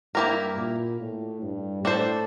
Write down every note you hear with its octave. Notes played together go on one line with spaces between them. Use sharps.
G2 A#3 E4 G4 A#4
A#2
A2
G2
A2 D4 A4 C5